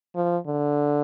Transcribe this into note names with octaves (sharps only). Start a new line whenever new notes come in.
F3
D3